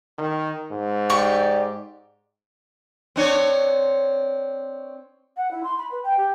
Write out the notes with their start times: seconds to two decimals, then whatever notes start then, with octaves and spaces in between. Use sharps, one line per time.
0.18 D#3
0.71 G#2
1.10 G4 D5 C#6
3.16 C4 D4 C#5
5.37 F#5
5.51 E4
5.64 C6
5.78 B5
5.91 B4
6.03 G5
6.17 G4